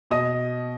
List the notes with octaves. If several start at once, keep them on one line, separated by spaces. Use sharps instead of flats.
B2 D#5 D#6